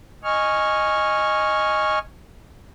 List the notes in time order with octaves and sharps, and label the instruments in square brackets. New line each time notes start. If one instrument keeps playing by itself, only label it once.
[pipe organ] D#5 G#5 C#6 F6